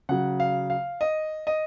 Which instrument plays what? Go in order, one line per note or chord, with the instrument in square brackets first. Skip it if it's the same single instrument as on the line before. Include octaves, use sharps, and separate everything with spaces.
[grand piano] C#3 F#3 F#5
F5
F5
D#5
D#5